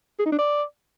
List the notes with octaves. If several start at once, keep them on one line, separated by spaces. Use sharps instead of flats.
G#4
D#4
D4
D5